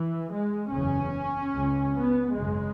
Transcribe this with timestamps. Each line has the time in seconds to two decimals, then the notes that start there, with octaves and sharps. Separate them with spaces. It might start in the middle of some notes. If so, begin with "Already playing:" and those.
Already playing: E3
0.32 G#3
0.72 F#1 E2 C#3 C#4
1.53 C#2 C#3
1.93 B3
2.34 G#1 F#2 C#3 G#3